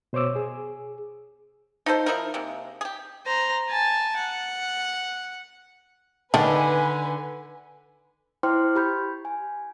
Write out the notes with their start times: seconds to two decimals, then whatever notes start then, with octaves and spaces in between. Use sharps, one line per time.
0.13 B2 C5 C#5 D6 E6
0.36 G#4
1.86 D#4 F4 A4 C5
2.06 F3 D#4 E4 A#4
2.34 C3 G#3 A#3
2.81 G4 G#4
3.26 C5 A#5
3.69 G#5 A5
4.16 F#5
6.34 D3 D#3 D4 B4 G#5
8.43 E4 C5 G5 C6 D6 F6
8.76 G4 B5 G6
9.25 G#5